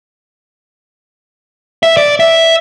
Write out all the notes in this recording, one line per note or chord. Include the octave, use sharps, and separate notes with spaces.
E5
D5
E5